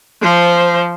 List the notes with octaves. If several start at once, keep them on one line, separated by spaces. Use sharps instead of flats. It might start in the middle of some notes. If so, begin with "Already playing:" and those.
F3 C5